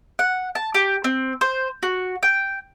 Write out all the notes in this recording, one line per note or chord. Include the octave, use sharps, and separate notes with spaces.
F#5
A5
G4
C4
C5
F#4
G5